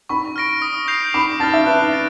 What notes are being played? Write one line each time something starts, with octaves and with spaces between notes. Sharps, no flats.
B5 C#6
F6 A#6 D7
D#6
G6 C7 F7
B5 D6
A5 F6 A6
E5
B4 F#6
A6 D7